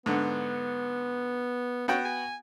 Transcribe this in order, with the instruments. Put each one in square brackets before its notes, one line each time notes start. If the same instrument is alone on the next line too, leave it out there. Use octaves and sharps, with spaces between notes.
[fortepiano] G#2 D3 [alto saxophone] B3
[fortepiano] B3 F#4 G5 [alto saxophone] C#4
[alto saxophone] G#5